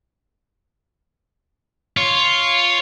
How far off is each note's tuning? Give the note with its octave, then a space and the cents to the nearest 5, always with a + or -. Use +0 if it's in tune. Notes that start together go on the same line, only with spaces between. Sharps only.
F4 +0 C#5 +0